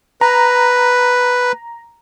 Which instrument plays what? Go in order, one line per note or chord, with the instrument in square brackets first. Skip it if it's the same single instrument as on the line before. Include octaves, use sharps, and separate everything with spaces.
[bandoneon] B4 [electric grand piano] A#5